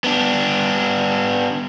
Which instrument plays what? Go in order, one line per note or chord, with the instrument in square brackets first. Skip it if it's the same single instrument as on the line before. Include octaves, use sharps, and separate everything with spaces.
[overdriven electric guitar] B3 D4